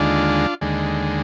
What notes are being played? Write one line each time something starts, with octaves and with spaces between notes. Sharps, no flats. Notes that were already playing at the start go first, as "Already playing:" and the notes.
Already playing: D#2 D3 G#3 D4 F4
D#2 D3 G#3